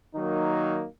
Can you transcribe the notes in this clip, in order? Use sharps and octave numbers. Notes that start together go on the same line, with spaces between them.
D#3 F#3 A#3 D#4